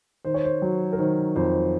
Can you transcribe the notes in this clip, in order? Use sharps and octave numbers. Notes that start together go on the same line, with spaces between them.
D#3 C5
C#5
C5
F#3
A#4
D#3 C5
F2 C5